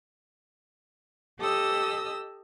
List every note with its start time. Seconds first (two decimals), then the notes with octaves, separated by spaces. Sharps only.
1.39 G4 A4 D#5 D#6 E6